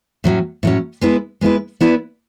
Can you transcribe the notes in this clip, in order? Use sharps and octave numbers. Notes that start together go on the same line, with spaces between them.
A2 F#3 C#4
A2 F#3 C#4
G#3 B3 E4 B4
G#3 B3 E4 B4
B3 E4 B4 D5